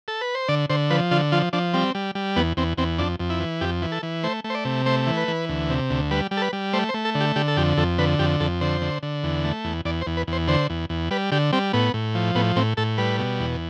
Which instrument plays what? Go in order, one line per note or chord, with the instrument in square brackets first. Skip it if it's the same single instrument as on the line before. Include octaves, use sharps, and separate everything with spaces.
[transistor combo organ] A4
B4
C5
D3 D5
D3 C5
F3 B4
D3 F4
F3 F4
F3 D4
G3 C4
G3
G3
E2 B3
E2 C4
E2 C4
F2 D4
F2
E4
E3
F2 G4
E3
A4
E3
A3 C5
A3
C5
D5
C3
A3 C5
E3
B4
E3
D2
C3
D2
G3 B4
G3
A4
B4
G3
A3 C5
C5
A3
A4
D3
G4
D3 G4
A4
F2 G4
F2 A4
D3 B4
F2 G4
F2 A4
D3 C5
D3
D3
E2
A3
E2
E2 D5
C5
E2
B4
E2 C5
D3 C5
E2
E2
G3 B4
D3 G4
G3 C4
A2 B3
A2
F3
A2 B3
A2 C4
A2 A4
G3 B4
B2
E2